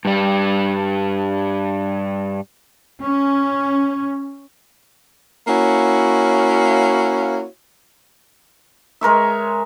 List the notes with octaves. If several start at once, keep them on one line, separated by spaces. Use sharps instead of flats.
G2 G3
C#4
A#3 C#4 E4 F#4 C#5 F5
G#3 A#4 C#5 E5